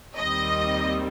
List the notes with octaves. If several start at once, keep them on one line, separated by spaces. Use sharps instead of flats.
D#2 D#3 G3 C4 D#5